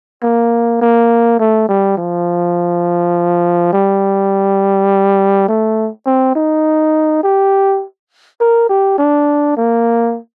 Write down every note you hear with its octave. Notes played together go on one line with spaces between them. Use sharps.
A#3
A#3
A3
G3
F3
G3
A3
C4
D#4
G4
A#4
G4
D4
A#3